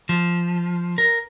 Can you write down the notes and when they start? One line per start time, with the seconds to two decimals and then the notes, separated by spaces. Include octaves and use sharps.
0.09 F3
0.98 A#4